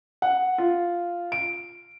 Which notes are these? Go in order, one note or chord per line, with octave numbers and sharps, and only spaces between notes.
F#5
F4
D7